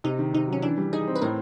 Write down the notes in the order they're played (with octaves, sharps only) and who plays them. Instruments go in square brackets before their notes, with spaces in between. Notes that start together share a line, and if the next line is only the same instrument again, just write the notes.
[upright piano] C3 [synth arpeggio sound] D#4
[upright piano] D#3
[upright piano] C3 [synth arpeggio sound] D#4
[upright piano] F#3 [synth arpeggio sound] C#4
[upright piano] E3 [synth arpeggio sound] D4
[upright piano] G3
[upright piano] D#4 [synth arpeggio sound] G#4
[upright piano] C4
[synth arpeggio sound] B4
[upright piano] A2 [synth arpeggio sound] A#4